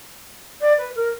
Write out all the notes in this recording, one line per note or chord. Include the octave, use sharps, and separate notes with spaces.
D5
B4
A#4